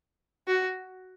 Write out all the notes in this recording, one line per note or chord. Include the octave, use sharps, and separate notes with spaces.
F#4